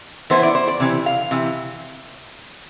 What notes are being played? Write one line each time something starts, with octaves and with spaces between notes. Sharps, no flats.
E3 B3 E4 C5
D5
C5
D5
C3 E3
F5
C3 E3